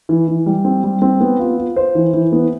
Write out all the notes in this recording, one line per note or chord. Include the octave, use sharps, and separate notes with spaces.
E3
E3
G3
C4
G3
C4
B3
F4
F4
C5
E3
E3
B3